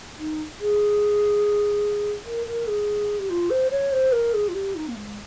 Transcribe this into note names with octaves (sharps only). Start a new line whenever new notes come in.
D#4
G#4
A#4
A#4
G#4
G4
F4
C5
C#5
C5
A#4
G#4
F4
G4
D#4
A#3
G#3